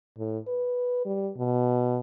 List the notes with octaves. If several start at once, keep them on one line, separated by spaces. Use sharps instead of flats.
A2
B4
G3
B2